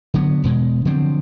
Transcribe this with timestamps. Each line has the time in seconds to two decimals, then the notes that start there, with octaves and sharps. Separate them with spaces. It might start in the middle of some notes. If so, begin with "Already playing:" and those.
0.14 D3 F#3 B3
0.44 E1 B2 G#3
0.85 D3 F3 F#3 C4